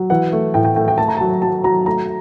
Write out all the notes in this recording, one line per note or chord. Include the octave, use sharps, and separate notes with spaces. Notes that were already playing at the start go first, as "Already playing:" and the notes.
Already playing: F#3
E3 F#5
A3
A2 G5
G5
A3 G5
G5
A3 A5
A#5
A5
F#3
F#3 A5
F#3 A#5
A3 A#5